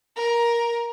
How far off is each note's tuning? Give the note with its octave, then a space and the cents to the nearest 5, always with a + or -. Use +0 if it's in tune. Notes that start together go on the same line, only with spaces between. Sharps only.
A#4 +15